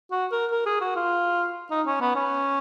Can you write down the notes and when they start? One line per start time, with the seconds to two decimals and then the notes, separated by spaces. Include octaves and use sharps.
0.11 F#4
0.32 A#4
0.51 A#4
0.66 G#4
0.81 F#4
0.96 F4
1.71 D#4
1.86 C#4
2.01 B3
2.16 C#4